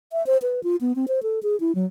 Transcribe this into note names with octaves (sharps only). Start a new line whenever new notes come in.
E5
C5
B4
F4
B3
C4
C5
A4
G#4
E4
F#3